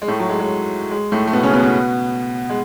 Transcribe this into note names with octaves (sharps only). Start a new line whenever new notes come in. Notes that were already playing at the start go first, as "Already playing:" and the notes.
G#3
A2 A3
F#3
G#3
G#3
G#3
A2 A3
A3
B2 B3
C#3 C#4
B2 B3
B2 B3
G#3